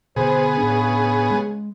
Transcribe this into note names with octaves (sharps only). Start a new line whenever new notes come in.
B2 D3 B3 G#4 C5
A2 C#3 D4
G#3